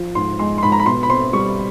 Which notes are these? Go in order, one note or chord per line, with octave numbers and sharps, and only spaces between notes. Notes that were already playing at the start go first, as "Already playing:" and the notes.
Already playing: F3
G#2 C6
G#3 C6
C6
G#2 B5
A#5
B5
B2 C6
B5
C4 C6
G3 C#6